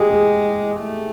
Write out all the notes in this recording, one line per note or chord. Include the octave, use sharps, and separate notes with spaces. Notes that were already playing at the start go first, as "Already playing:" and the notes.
Already playing: G#3 G4 G#4
G#4
A3